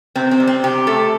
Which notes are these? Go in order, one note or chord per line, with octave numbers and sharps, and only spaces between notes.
C3 C4
C4
G3
C4
C3 G4
A3 A4